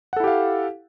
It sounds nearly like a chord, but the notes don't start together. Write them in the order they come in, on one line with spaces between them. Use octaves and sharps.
F#5 A4 E4 G4 F5